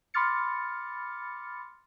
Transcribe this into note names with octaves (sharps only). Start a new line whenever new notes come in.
B5 C6 D6 F6 A6 C#7